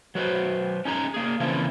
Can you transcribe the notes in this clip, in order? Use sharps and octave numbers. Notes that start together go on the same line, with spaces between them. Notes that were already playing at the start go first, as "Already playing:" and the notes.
F#3 F#4 B4 C5
C#4 D#4 G#4 A#5
A#3 G#4
C#3 E3 F3 A#3 C4 E4